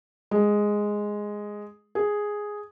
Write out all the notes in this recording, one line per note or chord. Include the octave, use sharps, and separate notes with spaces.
G#3
G#4